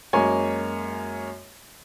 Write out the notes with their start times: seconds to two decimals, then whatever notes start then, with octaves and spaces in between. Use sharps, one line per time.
0.13 F#2 G#3 A#3 C#5 G#5